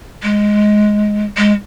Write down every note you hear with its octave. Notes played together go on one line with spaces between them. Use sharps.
G#3
G#3